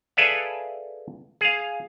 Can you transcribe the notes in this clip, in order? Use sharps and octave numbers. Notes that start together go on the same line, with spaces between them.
G#4 A4 B4 D5 E5 F5
G#4 F5